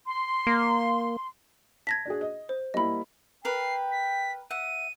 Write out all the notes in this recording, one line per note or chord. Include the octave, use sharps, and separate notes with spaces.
C6
A#3
A5 G#6 A#6 B6
D4 F#4 G#4
D#5
C5
G3 A#3 E4 D#5 B5
A#4 B4 G5 C7
B6
E5 F#5 D#7